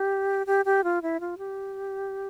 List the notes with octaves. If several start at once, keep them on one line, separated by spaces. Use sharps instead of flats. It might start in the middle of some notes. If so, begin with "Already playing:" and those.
Already playing: G4
G4
G4
F4
E4
F4
G4